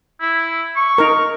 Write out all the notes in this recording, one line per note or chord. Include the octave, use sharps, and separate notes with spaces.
E4
C#6
D#4 A#4